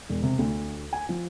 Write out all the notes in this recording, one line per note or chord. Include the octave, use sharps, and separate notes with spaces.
E1
C3
D2
G#5
F3